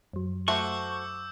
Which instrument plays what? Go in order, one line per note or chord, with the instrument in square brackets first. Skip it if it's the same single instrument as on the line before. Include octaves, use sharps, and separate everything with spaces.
[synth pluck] F#2 F#3
[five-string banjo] A3 F#4 C5 [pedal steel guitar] C#6 [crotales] D6 E6 G6